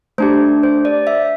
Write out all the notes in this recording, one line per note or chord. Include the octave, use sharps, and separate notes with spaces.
A3 D4 G4 C5
C5
D5
E5